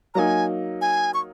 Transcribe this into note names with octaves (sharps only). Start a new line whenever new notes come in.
F#3 A#3 D#4 G#5 A#5
G#5
C#6